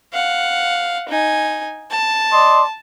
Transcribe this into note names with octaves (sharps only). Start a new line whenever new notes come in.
F5 F#5
D#4 G#5
A5
D5 D#5 C6